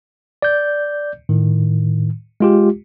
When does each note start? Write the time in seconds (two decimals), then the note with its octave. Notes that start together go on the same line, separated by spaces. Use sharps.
0.42 D5 G6
1.29 A2 D#3
2.40 G#3 F4 G4